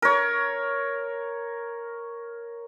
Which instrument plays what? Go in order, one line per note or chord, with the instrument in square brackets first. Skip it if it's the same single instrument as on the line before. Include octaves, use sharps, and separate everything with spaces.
[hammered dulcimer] A#4 C#5